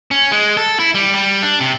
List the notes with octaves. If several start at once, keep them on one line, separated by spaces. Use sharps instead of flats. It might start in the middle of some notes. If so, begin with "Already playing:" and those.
C#4
G#3
A4
E4
G3
G3
D4
C3